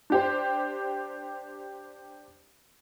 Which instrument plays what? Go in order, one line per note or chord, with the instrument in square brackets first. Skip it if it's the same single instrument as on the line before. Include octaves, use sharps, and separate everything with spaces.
[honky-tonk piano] D4 G4 C5